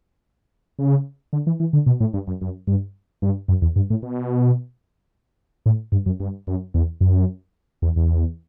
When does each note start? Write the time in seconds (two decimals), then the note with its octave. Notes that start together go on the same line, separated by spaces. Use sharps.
0.79 C#3
1.33 D3
1.47 E3
1.60 E3
1.73 D3
1.86 B2
2.00 A2
2.14 G2
2.27 F#2
2.41 F#2
2.67 G2
3.22 G2
3.48 F#2
3.62 E2
3.76 G2
3.90 A2
4.03 B2
5.66 A2
5.92 G2
6.06 F#2
6.20 G2
6.47 F#2
6.74 E2
7.01 F#2
7.82 E2
7.96 E2